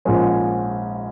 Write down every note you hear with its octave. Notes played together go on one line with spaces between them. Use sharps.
A#1 G#2 F3 G#3 C#4